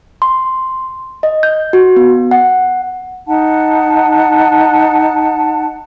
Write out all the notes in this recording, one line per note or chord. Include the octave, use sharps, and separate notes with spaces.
C6
D#5
G6
F#4
B3
F#5
D#4 F#5 A5